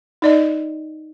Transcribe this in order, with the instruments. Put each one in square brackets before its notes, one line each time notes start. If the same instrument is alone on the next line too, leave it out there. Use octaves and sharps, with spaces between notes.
[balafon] D#4 D5 D#5